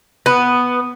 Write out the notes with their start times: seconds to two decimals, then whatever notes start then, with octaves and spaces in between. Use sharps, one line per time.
0.26 B3